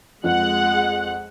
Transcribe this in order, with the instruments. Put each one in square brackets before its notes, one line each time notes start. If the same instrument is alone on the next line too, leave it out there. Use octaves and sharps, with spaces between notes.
[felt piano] F2 [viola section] G#3 F#5